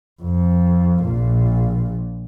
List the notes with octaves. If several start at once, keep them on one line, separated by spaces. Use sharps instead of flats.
F2
A#1 A#2